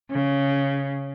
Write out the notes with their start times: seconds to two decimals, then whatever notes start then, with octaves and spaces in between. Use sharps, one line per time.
0.11 C#3